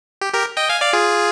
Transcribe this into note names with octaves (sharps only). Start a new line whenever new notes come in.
G4
G4 A#4
D#5 G5
F5 G#5
D5 F5
F4 G#4